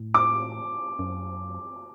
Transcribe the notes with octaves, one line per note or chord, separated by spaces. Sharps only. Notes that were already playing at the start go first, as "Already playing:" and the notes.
Already playing: A2
D6
F#2